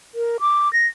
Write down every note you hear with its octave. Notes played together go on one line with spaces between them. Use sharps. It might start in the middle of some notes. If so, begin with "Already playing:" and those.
A#4
D6
A#6